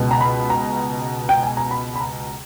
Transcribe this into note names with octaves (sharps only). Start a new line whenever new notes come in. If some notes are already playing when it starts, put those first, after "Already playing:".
Already playing: C#2 B2
A#5
B5
A#5
G5
G#5
A#5
B5
B5
A#5